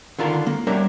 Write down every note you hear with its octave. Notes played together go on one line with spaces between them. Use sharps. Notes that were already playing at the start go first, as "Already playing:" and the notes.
D3 D#3 F4 A#4 A5
A#3
G3 A#3 D4 A#4 C#5 E5